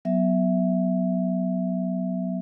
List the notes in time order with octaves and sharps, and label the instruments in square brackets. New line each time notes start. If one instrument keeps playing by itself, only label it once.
[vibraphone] F#3 B3 E5